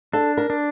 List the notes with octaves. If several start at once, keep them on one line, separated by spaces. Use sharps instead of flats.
D4 A4
A#4
D4